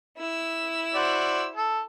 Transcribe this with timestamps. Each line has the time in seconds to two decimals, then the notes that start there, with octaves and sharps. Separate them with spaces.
0.18 E4 E6
0.95 F#4 C5 D5
1.55 A4